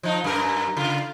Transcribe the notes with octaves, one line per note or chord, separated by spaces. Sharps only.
F3 D#4
F#2 A#4
C#3 F4